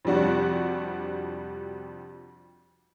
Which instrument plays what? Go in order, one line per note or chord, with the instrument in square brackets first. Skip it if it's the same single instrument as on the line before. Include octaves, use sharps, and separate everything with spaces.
[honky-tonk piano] F2 C3 G3 D4 F#4